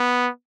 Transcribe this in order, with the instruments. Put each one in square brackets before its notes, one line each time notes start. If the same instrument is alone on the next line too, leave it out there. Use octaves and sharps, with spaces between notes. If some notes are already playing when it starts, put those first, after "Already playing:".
Already playing: [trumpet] B3